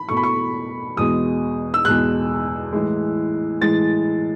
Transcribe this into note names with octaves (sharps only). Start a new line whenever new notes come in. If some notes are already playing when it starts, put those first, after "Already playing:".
Already playing: B5
B2 A3 C#6
B5
C#6
E2 B2 G#3 D#6
E6
E2 B2 G#3 F#6
A2 E3 G#3
A2 E3 G#3 A6